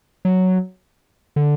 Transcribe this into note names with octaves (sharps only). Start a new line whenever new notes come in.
F#3
D3